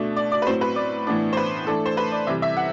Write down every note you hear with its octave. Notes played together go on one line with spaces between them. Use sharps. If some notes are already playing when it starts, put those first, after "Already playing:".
Already playing: B2 A3 D4
D5
D5
B4
A2 F#3 C4 C5
B4
D5
A2 E3 B3 D4
C5
B4
E3 A3 D4 A4
C5
B4
D5
C3 E3 G3 E5
E5
F#5